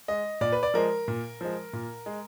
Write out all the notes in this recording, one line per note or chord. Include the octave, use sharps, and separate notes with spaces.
G#3 D#5
A#2 D5
B4
D5
F3 G#3 A#4
A#2
F3 G#3
A#2
G#3